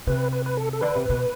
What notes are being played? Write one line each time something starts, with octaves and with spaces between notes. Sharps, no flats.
C3 B4
B4
B4
A4
A4
D3 B4
C3
B2